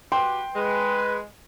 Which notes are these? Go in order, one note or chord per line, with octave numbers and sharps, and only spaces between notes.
F#4 G4 B4 G5 C6
G#3 B4